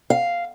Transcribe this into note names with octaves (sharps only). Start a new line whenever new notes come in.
F5